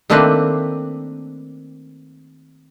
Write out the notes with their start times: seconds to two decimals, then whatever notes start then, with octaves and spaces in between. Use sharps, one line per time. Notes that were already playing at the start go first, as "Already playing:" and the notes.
0.10 D#3 A3 A#3 C4 D4 B4